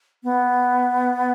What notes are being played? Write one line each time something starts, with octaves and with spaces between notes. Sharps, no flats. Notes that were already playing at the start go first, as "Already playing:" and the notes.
B3